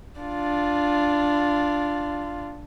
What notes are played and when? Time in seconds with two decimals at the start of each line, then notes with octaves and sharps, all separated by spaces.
0.21 D4 F4